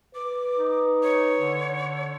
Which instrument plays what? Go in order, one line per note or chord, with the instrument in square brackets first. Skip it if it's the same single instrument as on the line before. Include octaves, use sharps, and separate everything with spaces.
[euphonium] B4 [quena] D6
[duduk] D#4
[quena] C#5
[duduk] D3